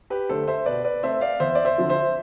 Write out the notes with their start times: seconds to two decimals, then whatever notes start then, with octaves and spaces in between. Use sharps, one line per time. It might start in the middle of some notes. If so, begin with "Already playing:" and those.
0.10 G4 B4
0.29 D3 A3 D4 A4 C5
0.48 C5 E5
0.66 B2 B4 D5
0.84 B4 D5
1.03 A3 C4 C5 E5
1.21 D5 F5
1.40 E2 C5 E5
1.55 D5
1.65 C5 E5
1.78 D3 F3 C4
1.89 C5 E5